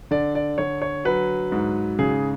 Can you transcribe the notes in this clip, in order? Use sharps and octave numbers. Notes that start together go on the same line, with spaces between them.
D3 D5
D5
D3 C#5
C#5
F#3 B4
G#2
C#3 G#4